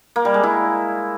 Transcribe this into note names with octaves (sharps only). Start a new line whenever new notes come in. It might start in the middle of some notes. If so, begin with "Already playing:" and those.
A#3
G3
G#3
E4